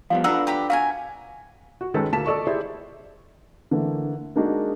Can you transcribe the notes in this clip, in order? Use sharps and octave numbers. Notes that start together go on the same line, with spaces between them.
F3 G3 B3 F5
D4 F4 A4 B4 F#5 A#5 E6
G4 A#5 B5
F#4 A#4 F5 G#5
F#4
D#3 G#3 C#4 A4 B4
D2 A#3 A5 B6 E7
A4 D5 D#5 C#6
E4 G4 G#4 C5 D5 E5
D3 E3 A3 A#3
G#3 A#3 D4 D#4 F#4 G#4